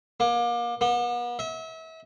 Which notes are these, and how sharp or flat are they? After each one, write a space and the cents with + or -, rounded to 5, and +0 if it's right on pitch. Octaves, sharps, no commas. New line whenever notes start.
A#3 +35
B3 -40
E5 -35